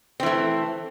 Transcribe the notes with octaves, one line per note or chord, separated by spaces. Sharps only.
E3 A3 C4